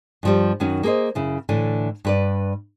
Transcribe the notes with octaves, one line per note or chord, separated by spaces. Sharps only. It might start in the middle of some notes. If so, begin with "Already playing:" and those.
G2 F3 G3
F#2 D#3 C#4 F#4
A#3 G#4 A4 C5 D#5
F#2 C#3 E4
A2 D3 E3
G2 B4 D5